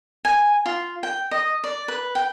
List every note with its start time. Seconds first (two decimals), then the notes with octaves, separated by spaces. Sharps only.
0.25 G#5
0.66 F4
1.03 G5
1.31 D#5
1.64 D5
1.88 B4
2.15 G5